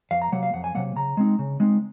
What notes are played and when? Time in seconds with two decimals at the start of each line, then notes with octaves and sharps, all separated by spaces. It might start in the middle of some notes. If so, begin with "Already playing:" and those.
0.11 F2 F5
0.22 A#5
0.32 C3 F#3 A#3 F#5
0.43 F5
0.53 F2 F#5
0.64 G#5
0.75 C3 F#3 A#3 F#5
0.96 C#3 A#5
1.17 G#3 C4 D#4
1.39 C#3
1.60 G#3 C4 D#4